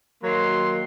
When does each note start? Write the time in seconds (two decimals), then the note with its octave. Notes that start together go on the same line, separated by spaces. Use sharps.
0.24 D#3 F#3 A#3 C6